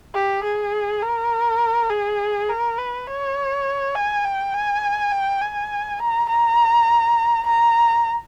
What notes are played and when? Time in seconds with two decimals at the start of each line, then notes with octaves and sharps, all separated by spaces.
0.15 G4
0.44 G#4
1.02 A#4
1.90 G#4
2.49 A#4
2.78 B4
3.07 C#5
3.95 G#5
4.24 G5
4.54 G#5
5.12 G5
5.41 G#5
6.00 A#5
6.29 A#5
7.46 A#5